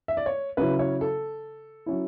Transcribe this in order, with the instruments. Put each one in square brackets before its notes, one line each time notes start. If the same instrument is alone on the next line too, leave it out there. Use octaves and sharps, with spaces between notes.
[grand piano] E5
D5
C#5
[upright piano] C#3 F#3 C#4 E4 [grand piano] B4
[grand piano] C#5
A4
[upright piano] F#3 C#4 E4